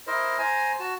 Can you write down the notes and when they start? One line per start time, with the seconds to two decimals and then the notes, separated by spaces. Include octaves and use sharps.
0.07 E4 A#4 C5 D#5
0.38 C5 G#5 A#5
0.80 F#4 A5